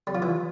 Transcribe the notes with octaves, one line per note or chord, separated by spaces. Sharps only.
G3
F3
E3